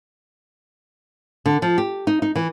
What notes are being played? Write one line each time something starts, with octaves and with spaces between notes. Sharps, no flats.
D3
F3
G4
D#4
D#4
E3